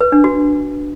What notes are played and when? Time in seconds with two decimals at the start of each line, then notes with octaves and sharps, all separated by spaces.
0.01 B4
0.12 D4
0.24 F#4